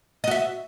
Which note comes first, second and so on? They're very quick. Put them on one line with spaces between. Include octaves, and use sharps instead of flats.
D#5 F#4 E5